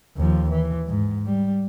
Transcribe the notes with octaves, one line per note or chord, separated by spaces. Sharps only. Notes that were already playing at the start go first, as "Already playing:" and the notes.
D#2 F3
E3
G#2
G3